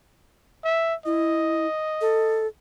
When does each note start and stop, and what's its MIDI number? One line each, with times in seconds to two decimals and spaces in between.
0.64 0.94 76
1.06 1.66 64
1.06 2.47 75
2.01 2.47 69